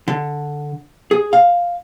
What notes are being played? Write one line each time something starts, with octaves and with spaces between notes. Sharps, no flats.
D3
G#4
F5